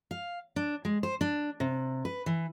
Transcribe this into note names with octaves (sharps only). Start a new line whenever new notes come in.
F5
D4
G#3
C5
D4
C3
B4
E3